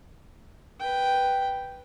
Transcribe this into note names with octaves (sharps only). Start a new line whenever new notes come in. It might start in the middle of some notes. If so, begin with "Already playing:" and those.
B4 G5